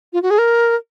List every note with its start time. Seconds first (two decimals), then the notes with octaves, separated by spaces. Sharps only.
0.13 F4
0.22 F#4
0.30 G#4
0.38 A#4